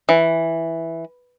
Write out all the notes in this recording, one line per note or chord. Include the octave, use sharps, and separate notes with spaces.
E3